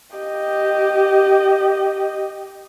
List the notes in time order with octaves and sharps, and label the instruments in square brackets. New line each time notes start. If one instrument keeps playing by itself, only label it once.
[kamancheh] G4 D#5